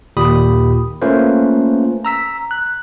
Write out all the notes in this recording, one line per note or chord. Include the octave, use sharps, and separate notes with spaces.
D#2 A#2 G4 B5 D#6
A3 A#3 C#4 F4 B4 C5
A#5 E6 B6
F#6